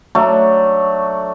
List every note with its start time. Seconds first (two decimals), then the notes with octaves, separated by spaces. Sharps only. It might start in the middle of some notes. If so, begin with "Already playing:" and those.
0.15 F#3 A3 D4